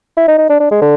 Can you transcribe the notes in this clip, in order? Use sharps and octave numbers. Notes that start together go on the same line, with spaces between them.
E4
D#4
D#4
D4
D4
G#3
D3